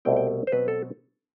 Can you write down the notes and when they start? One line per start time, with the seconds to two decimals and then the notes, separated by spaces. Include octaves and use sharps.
0.05 C2 B2 A3 C4 G5
0.17 G5
0.47 C5
0.52 B2 F#3 C4 B4
0.68 A4